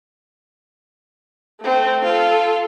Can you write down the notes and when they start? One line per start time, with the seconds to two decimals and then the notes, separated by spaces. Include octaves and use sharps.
1.61 A3 C4
2.05 F4 A4